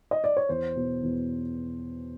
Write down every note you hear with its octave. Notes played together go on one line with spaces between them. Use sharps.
D#5
D5
C#5
E2 C5
B2
E2